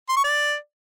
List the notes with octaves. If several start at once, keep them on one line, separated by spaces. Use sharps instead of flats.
C6
C#6
D5